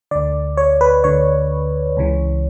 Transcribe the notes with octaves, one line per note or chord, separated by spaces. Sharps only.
D2 D3 D5
C#5
B4
D2 D3 C#5
C#2 C#3 E3